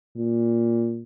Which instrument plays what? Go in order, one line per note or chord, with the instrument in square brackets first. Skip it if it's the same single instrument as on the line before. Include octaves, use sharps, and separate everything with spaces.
[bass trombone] A#2